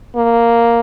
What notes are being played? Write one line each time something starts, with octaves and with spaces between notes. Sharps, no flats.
A#3